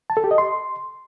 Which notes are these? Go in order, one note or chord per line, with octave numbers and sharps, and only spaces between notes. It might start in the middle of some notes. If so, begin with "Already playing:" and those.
A5
A4
G4
D#5
C6